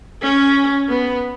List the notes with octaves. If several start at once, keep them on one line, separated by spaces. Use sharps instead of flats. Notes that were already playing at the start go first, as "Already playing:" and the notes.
C#4
B3